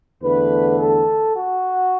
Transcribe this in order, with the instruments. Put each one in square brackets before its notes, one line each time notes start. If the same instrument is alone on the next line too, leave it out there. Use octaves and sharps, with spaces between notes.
[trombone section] E2 D3 A3 B4
A4
F#4